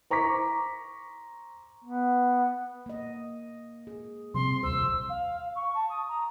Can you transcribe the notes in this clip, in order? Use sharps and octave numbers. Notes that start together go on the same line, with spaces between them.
C5 A#5 C#6 D6 B6
B3
A#3 D#5
G#4
C3 F3 G3 C4 C6
D#1 C2 F2 C5 E6
F5
C#6
A5
D#6
A#5